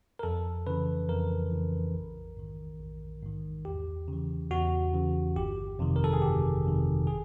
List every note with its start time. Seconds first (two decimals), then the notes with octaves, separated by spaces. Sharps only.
0.19 A#4
0.23 F2 A4
0.67 C#3 E3 B4
1.09 F2 A#4
1.51 C#3 E3
1.94 A#1
2.37 G#2 D#3
2.79 A#1
3.23 G#2 D#3
3.65 E2 G4
4.08 C#3 E3
4.51 E2 F#4
4.93 C#3 E3
5.36 G1 G4
5.79 F2 C3 D#3
5.96 A#4
6.04 A4
6.13 G#4
6.22 G1 G4
6.64 F2 C3 D#3
7.07 G#4